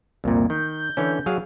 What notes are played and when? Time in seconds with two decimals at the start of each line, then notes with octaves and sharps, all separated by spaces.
0.24 C2 F2 A#2 A#3
0.50 D#3 G6
0.97 D3 E3 C#4
1.26 F#3 G#4 F5